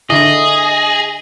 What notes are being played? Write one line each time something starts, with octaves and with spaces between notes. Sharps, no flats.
D3 E4 G#4 D#5